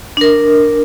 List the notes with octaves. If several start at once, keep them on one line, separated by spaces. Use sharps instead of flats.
D4 A#4